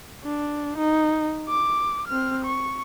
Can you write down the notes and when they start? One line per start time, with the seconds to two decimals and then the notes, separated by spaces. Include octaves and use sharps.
0.24 D4
0.78 D#4
1.49 D6
2.08 C4 F6
2.45 C#6